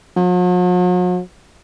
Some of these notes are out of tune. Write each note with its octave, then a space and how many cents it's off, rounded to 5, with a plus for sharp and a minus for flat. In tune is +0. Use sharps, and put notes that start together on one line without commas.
F#3 -45